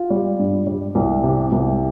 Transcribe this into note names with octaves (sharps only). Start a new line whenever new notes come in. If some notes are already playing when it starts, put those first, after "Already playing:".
Already playing: F4
G3
G2
G3
C2
C3
C2